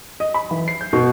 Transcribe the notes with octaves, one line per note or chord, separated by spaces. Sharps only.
D#5
B5
E3
C7
G6
B2